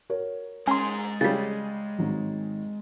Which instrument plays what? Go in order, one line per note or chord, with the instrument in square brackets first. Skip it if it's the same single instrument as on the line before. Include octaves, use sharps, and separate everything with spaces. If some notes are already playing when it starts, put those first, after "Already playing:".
[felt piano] F#4 A#4 C#5
[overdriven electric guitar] G#3 A#5 [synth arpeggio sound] C#4 C6
[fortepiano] C#3 G3 [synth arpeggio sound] A6 B6
[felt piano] G#1 D#3 F#3